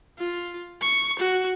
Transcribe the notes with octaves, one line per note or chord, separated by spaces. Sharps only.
F4
C#6
F#4